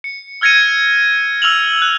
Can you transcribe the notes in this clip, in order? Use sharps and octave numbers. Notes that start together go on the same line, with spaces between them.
C#7
E6 F6 G#6 A#6 C#7 D#7
E6 F6 F7 F#7
F#6